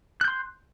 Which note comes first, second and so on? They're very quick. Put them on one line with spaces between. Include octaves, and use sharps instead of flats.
F#6 G6 C6